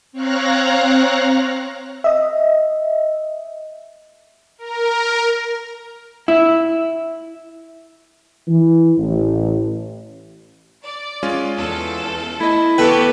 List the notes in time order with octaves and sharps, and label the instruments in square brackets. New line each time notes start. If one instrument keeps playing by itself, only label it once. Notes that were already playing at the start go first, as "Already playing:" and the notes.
[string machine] C4 C#5 F5 A#5 F#6 A#6
[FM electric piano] D#5 E5
[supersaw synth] A#4
[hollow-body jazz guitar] E4
[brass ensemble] E3
A1
[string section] D5
[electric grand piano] G#3 C#4 F4
[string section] E2 A4
[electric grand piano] A3 D#5 [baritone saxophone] E4
[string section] B3 F#4 G4 [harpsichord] A4 B4 [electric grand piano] G5 A5 F#6